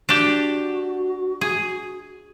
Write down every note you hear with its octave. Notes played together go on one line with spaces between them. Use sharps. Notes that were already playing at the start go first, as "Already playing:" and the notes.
D4 F#4 G4
G#4